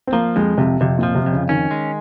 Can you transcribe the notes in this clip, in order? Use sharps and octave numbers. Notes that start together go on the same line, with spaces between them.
C4
F3 A#3
F2 G#3
F2 C3
F2 C3
A#2 F3
C3
F2
C#3
D#3 C#4
G#3